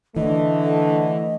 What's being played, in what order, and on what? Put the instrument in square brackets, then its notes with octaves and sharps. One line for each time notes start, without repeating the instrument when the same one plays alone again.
[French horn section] D3 A3 [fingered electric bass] E3 [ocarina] D#5